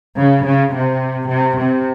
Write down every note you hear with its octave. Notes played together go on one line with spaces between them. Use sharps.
C#3
C#3
C3
C3
C3